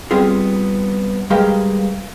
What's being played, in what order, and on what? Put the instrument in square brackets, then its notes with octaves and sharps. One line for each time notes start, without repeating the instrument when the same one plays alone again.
[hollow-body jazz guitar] G3 B3 C4 F4 G#4
G3 G#3 G4 A#4 B4 F5